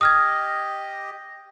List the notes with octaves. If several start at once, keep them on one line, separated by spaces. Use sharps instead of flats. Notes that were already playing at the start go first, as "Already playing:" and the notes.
G4 D#5 D#6 F6 G#6